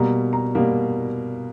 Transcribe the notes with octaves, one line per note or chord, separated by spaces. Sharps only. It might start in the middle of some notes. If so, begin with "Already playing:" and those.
Already playing: B2 G3 A#3 A#5
A#5
B2 G3 A#3